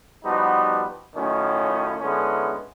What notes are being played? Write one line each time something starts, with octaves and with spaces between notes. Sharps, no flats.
F3 G3 B3 D#4 F#4
F#2 A2 D#3 C#4 F4
D3 G#3 B3 C#4 E4